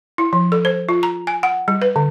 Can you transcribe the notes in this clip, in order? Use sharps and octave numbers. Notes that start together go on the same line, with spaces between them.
E4
F3
A4
C5
F4
A#5
G#5
F#5
G3
B4
D3